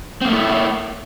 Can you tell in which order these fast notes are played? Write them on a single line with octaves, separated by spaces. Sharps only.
C4 A#3 A3 E4